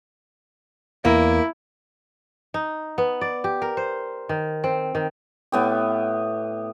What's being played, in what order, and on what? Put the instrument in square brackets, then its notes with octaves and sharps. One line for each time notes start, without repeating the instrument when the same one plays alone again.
[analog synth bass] E2 [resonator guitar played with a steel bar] A#3 [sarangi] E4
[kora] D#4
B3
D5
G4
A#4
C5
D#3
C4
D#3
[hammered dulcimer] A2 B3 G4